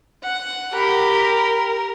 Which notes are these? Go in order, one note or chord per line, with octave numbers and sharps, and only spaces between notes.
F#5
G4 A#4 B5